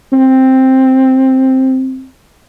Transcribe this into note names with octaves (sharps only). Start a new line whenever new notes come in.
C4